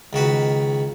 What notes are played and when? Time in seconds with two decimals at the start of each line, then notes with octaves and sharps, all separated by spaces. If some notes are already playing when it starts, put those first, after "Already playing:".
0.13 C#2 D#3 F#4 B4